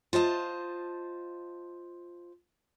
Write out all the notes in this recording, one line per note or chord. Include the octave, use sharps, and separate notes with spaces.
F4 C5 D#5 A5